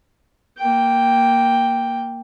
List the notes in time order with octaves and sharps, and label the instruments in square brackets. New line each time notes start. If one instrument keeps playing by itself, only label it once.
[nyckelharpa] A#3 G5